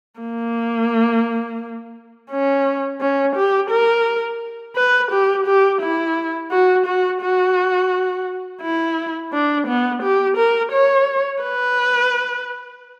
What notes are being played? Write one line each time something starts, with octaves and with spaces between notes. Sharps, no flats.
A#3
C#4
C#4
G4
A#4
B4
G4
G4
E4
F#4
F#4
F#4
E4
D4
B3
G4
A#4
C#5
B4